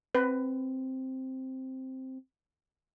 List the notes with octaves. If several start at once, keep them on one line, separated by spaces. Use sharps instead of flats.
C4 B4